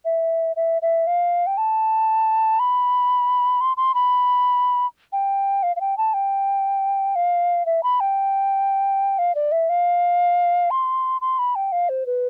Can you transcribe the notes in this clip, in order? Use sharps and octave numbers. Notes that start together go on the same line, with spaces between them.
E5
E5
E5
F5
G5
A5
B5
C6
C6
B5
G5
F5
F5
G5
A5
G5
F5
E5
B5
G5
F5
D5
E5
F5
C6
C6
B5
G5
F5
C5
B4